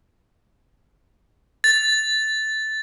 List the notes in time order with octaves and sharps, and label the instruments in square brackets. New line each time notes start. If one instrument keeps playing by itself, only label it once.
[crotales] A6